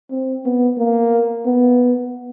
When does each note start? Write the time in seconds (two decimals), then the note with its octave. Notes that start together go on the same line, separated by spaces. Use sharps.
0.11 C4
0.45 B3
0.78 A#3
1.46 B3